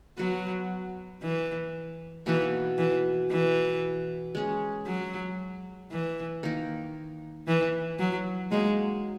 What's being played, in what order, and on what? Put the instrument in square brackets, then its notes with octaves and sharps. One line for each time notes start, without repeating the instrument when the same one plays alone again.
[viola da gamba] F#3 [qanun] B3 F#4 B4
[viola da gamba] E3
[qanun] B2 A#3 D#4 F#4 [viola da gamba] E3
[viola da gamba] E3
E3
[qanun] G#3 C#4 G#4
[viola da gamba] F#3
E3
[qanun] D#3 A#3 D#4 A#4
[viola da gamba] E3
F#3
[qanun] F#3 A#3 D#4 [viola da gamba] G#3